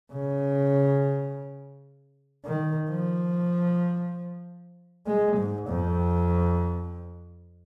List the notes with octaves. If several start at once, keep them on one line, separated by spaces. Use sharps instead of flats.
C#3
D#3
F3
G#3
G#2
F2